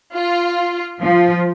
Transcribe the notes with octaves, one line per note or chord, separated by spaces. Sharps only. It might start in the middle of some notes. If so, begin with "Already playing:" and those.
F4
F3